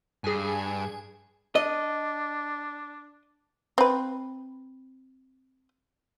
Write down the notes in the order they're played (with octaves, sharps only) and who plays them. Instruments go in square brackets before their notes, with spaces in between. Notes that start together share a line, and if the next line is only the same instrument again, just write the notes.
[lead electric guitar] G2 [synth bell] G#4 G#5
[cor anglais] D4 [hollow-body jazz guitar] D#5
[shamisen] C4 B4